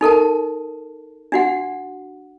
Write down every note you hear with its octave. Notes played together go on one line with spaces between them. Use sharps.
D#4 A4 A#4 A5
D4 F#4 F#5